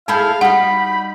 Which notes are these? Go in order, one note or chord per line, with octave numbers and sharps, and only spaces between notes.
E4 G#4 A4 F5 A5 B5 G6
G3 D#4 F#4 F#5 B5